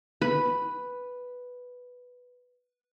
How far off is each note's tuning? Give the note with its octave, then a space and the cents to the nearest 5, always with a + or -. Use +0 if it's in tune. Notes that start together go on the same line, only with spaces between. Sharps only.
B4 +0 B5 +0